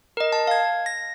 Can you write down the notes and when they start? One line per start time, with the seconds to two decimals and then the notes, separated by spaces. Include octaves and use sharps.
0.17 A#4 D#5
0.32 A5
0.47 F5 G#6
0.86 A#6